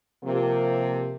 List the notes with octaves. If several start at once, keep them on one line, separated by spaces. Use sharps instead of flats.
C3 F3 A#3